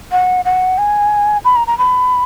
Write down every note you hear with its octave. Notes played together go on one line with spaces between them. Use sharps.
F#5
F#5
G#5
B5
A#5
A#5
B5